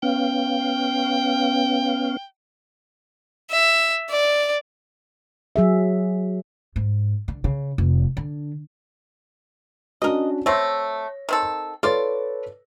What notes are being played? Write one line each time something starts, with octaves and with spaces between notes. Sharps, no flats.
B3 C#4 F5 G5
E5
D5
F#3 G#4 E5
G#2
D3
C#3
F1
D3
C#4 D4 F#4 A#4 D#5
A3 C4 C#5 A#6
D#3 C4 A4
F4 A4 B4 C#5 D5